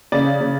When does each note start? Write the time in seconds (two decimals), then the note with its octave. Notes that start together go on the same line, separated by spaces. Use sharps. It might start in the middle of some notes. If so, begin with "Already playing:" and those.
0.12 C#3 D5
0.41 C#3